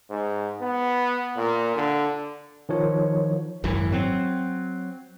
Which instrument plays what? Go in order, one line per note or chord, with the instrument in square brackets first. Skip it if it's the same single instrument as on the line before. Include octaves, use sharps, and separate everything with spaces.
[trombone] G#2
B3
A#2
D3
[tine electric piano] D#3 F3 C#5
[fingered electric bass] G#1 F#2 E3
F#3 C4